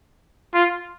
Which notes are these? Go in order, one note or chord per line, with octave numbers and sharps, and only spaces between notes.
F4